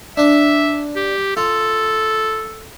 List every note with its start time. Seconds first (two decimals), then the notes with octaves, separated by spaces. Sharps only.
0.17 D4 E5
0.96 G4
1.37 F4 A4